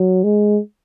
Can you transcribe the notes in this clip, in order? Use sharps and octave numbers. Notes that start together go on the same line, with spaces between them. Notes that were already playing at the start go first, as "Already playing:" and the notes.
Already playing: F#3
G#3